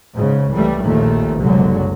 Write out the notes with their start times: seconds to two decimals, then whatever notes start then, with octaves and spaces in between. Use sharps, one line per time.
0.15 G#2 C#3
0.51 C2 E3 G3 A3
0.82 A#1 D#2 A#2 D#3 A3
1.42 F#1 C2 D3 F#3 G#3